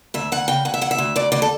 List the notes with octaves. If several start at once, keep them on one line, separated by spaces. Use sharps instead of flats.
D2 E5
D2 F#5
C#3 G5
D2 F#5
E5
D2 F#5
E5
D2
D2 D5
D2 D5
A4